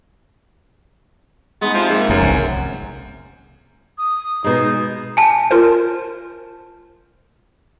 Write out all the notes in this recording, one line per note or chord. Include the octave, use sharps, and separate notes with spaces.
G#3 B3 D#4
C3 F3
G#2 A#3
F1 F#2
G1 C2
D#6
B2 G#3 D#4
G#5 A5
F4 A#4 C5